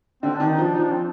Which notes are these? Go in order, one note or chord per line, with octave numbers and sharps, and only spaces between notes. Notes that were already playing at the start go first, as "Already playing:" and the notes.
D3 C4
D#3 D4
D#4
F3 D4
F3 D#4
D4
C4